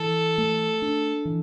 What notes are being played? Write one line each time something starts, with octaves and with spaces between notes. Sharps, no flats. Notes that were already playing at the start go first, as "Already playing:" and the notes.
Already playing: E3 A4
A3
D4
E3